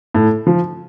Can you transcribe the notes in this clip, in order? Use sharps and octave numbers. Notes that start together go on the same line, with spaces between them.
A2
F3